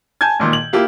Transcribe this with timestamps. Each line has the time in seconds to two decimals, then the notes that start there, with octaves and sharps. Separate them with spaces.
0.21 G#5 A5 G6 G#6
0.40 B1 A#2 D#3
0.53 F#7
0.73 A#3 E4 F4 G4 F5